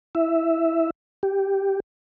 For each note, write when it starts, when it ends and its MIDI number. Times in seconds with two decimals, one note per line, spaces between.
0.15 0.90 64
0.15 0.90 76
1.23 1.80 67